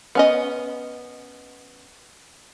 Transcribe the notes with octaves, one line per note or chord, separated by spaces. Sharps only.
B3 C#4 D#5